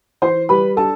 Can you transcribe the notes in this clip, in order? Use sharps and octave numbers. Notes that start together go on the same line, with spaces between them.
E3 C5 C6
G3 B4 B5
D4 A4 A5